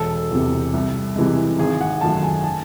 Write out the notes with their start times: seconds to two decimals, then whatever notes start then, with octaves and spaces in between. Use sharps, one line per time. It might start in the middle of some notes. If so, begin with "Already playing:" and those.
Already playing: E1 A4
0.31 E2 C3
0.74 C2
1.16 C3 E3 G#3
1.59 G#1 G#4
1.81 F#5
2.01 F#2 D#3 A3 A5
2.23 G#5
2.44 A5